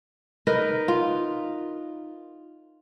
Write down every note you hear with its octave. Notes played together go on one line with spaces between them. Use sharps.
D#4 A#4 B4
F4